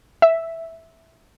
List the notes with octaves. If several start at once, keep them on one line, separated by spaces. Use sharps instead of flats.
E5